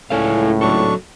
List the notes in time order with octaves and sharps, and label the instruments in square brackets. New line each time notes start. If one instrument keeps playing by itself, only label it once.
[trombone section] C#2 A2 [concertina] C#4 [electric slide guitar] E4 A4 F5
[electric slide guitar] F#3 A4 [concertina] D4 C#6